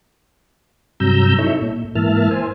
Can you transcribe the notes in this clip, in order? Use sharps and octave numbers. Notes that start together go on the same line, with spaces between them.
G2 C3 F#3 A#5 E6 G6
D#4 E4 A4 C#5 E5
A#2
G#2 E3 A#3 E5 A5 F6
C5 G#5